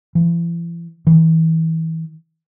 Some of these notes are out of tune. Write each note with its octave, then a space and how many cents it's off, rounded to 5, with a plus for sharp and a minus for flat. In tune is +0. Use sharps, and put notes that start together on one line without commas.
E3 +45
E3 -30